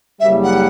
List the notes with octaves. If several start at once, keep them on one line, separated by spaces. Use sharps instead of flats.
F#1 F#2 C#3 G3 E5
F#5